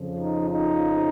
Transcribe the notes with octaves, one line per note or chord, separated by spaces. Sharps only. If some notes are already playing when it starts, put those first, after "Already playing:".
Already playing: F2 C#3 F3
D#4
D#4